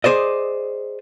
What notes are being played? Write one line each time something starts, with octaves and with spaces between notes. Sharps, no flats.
G#4 C5 D5 D#5